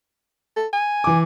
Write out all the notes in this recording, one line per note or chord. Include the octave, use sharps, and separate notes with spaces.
A4
G#5
E3 D6